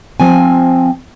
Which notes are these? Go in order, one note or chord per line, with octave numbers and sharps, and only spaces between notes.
F3 C4 G#5